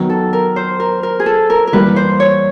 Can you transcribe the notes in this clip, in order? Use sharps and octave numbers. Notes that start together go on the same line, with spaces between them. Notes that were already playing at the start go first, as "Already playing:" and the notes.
Already playing: D#3 F#3 B3
A4
A#4
C5
A#4
A#4
G#4
A4
A#4
A#4
E3 G3 A#3 B4
C5
C#5